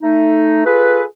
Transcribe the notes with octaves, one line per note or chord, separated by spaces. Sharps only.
A3 D#4
F4 G#4 A4 B4